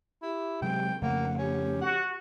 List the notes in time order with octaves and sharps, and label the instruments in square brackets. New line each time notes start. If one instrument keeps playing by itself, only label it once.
[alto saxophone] E4 [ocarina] G4
[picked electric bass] C3 F#3 G#3 [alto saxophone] G5
[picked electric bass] F2 C#3 A3 [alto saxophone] A#3 [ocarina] F#5
[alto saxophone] C#4 [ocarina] G4
[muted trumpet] F#4 [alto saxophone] F#5